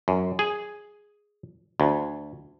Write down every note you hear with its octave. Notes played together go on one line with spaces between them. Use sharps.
F#2
G#4
D2